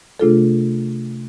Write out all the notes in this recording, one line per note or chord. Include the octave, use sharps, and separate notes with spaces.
C3 A3 D4 F4 G#4 A4